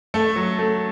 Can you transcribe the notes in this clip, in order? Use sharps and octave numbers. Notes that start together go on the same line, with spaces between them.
A3 A4
F#3
A3